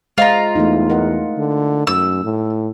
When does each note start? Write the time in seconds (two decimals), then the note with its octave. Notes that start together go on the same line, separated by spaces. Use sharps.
0.18 G#3 F4 C5 D#5 A#5
0.56 E2 A3 D#4
0.90 A#4 D#5 F#5
1.37 D3
1.87 F#2 E6
2.24 A2